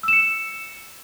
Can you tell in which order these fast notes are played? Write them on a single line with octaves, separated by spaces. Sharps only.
E6 E7 C#7